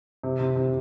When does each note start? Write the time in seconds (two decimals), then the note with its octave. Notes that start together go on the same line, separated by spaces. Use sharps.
0.23 C3
0.40 C3
0.56 C3